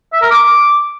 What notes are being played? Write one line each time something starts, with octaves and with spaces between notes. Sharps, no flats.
E5
A#4
D6